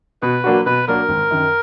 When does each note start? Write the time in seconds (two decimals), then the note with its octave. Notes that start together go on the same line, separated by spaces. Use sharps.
0.22 B2 B4
0.44 F#3 A#3 D4 F#4
0.66 B2 B4
0.88 F#3 A#3 D4 F#4 A#4
1.09 G#1
1.31 F#2 D#3